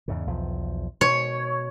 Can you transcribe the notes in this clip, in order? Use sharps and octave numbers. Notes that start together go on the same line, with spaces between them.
E2 G#2 C#3
B1 E2 F3
B2 C#5